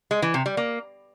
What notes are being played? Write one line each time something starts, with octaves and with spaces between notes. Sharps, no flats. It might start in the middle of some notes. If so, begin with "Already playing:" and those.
G#3
E3
C3
G3
A#3